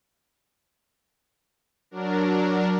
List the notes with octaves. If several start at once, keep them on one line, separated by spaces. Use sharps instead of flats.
F#3 D4 A#4